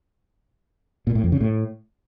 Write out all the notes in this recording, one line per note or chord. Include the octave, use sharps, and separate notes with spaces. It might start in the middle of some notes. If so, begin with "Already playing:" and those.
A#2
A2
F2
C#3
A2